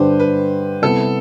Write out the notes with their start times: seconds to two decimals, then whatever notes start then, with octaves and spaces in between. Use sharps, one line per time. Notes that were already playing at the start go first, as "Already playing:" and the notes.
Already playing: G2 D3 G3 D4 G4 B4 C5
0.20 B4
0.82 C3 G3 B3 E4 A4